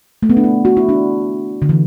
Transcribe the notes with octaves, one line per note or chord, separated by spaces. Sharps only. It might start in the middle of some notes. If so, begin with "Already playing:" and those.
A3
B3
D4
E4
F#4
E4
D4
D3
E3